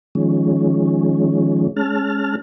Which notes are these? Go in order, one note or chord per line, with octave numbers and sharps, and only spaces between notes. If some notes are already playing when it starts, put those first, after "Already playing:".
D#3 F3 G#3 C#4
G#3 C#4 A5 F6